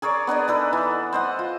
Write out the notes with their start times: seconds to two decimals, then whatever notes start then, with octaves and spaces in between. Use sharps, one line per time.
0.02 G#4 A#4 C#5 D5
0.27 B3 D4 B4 D#5
0.48 D#4 A4 B4
0.73 E3
1.13 C5 D#5 F#5
1.39 F4